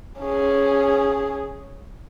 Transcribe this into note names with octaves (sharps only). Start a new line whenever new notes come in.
C#4 G#4